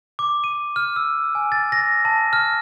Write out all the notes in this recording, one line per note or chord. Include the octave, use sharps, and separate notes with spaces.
D6
D#7
F6
E6
G#5
A6
A#6
A5
F6